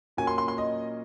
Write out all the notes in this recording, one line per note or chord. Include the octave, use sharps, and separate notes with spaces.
A#2 F#3 A#3 C#4 G#5
C6
C6
C6
D#5